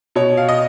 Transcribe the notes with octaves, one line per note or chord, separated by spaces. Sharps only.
B2 C#5
F5
D#5